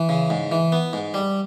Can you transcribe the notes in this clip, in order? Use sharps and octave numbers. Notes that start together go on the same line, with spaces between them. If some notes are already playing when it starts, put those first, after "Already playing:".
Already playing: E3
C#3
G#2
E3
B3
G#2
G3